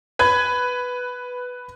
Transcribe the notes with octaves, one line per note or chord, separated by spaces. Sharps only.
B4 B5 G#6